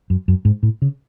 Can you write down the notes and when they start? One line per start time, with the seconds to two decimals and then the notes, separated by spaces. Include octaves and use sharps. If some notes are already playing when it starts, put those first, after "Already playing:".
0.10 F#2
0.28 F#2
0.45 G#2
0.63 A2
0.82 C#3